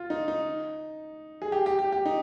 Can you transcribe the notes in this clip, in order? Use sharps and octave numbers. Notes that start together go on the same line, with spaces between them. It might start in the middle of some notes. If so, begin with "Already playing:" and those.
Already playing: F4
D#4
D#4
G#4
G4
G4
G4
G4
D#4